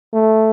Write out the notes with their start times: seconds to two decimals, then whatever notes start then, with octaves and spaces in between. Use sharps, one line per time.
0.14 A3